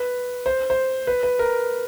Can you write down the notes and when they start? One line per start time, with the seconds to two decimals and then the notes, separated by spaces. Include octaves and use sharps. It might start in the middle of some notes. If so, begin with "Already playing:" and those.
Already playing: B4
0.46 C5
0.70 C5
1.07 B4
1.23 B4
1.39 A#4